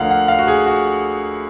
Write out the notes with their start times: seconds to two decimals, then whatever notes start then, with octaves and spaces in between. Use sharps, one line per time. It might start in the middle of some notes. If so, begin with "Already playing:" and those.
Already playing: D2 D3 F3 A#3 F5 F#5
0.11 F#5
0.28 F5
0.39 F#4
0.47 G#4
0.66 F#4